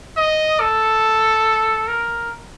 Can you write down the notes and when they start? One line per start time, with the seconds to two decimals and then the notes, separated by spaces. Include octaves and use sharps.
0.17 D#5
0.60 A4
1.88 A#4